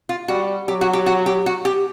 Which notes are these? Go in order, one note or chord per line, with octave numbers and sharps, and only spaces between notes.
F4
G3 F#4
F#3 G4
F#4
G4
F#4
G4
F#4
G4